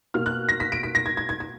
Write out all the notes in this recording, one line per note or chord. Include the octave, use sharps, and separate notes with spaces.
B2 A#3 F6
F#6
A#6
B6
D7
B6
A#6
G#6
G#6
G#6
G#6